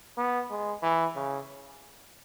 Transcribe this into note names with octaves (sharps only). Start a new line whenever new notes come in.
B3
G#3
E3
C#3